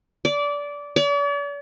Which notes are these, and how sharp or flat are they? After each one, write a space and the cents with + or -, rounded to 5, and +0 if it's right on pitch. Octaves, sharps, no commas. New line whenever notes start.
D5 -20
D5 -45